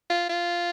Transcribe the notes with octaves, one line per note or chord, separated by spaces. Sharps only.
F4
F4